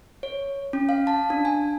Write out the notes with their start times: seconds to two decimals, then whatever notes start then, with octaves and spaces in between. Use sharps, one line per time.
0.23 C#5
0.73 C#4
0.89 F5
1.07 A5
1.30 D4
1.45 G#5